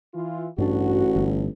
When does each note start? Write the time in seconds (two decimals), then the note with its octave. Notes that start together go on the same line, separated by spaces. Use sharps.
0.14 E3 F4
0.58 A1 G2 D4 F#4
1.16 G1